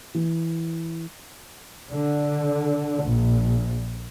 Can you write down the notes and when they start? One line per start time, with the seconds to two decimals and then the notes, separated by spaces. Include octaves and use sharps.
0.15 E3
1.93 D3
3.04 A#1